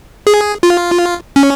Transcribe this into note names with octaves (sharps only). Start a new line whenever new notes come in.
G#4
F4
C#4